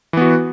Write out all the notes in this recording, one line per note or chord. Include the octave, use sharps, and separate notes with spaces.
E3 B3 F#4